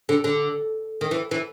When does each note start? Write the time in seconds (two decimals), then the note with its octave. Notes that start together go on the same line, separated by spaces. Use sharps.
0.09 D3
0.24 D3
1.01 D#3
1.11 E3
1.31 E3